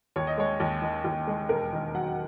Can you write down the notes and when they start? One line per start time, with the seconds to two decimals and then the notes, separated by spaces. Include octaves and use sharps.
0.16 D#2 C#5
0.27 D#5
0.38 G#3 C#5
0.60 D#2
0.82 D#3
1.04 D#2
1.27 G#3
1.49 E1 A#4
1.73 D#3
1.94 F#3 F#5